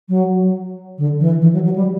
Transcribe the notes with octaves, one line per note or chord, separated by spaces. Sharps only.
F#3
D3
E3
E3
F#3
F#3
G3